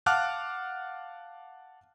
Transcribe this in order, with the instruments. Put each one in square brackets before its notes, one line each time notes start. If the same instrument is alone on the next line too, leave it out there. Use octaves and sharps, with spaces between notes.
[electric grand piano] F5 F#5 A5 D6 F6 F#6